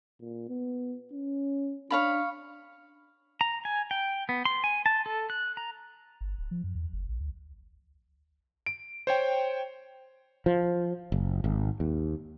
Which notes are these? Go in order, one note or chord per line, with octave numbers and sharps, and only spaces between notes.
A#2
B3
C#4
D4 C#5 F5 B5
A#5
G#5
G5
B3
C6
G#5
A5
A4
F#6
A#5
G1
D1
F3
F#2
E2
F#1
A#1
D2
D7
C5 C#5 G5
F3
F#1
G#1
D#2